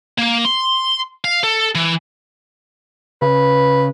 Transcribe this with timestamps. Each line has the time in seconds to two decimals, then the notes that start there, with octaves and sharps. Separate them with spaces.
0.18 A#3
0.45 C6
1.24 F5
1.43 A4
1.75 E3
3.22 C#3 B4